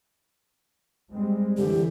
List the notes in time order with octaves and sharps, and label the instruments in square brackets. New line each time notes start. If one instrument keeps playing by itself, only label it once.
[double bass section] G3 G#3 C4
[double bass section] D3 E3 [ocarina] G4